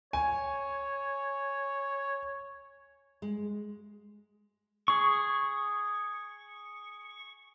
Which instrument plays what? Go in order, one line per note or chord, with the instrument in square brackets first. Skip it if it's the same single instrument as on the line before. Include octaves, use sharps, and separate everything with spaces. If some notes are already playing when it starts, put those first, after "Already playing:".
[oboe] C#5 [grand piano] G#5
[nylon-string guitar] G#3
[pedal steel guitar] G#4 C#6